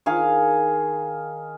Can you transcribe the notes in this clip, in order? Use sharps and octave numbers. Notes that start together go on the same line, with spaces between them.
D#3 G#4 F5